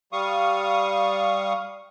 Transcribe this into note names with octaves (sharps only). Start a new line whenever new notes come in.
G3 F5 C#6 D#6